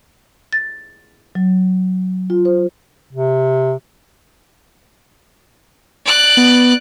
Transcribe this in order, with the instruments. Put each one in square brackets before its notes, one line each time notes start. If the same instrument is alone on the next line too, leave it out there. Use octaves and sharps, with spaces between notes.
[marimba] A6
F#3
F4
C5
[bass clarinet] C3
[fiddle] D5 F#6
[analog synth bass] B3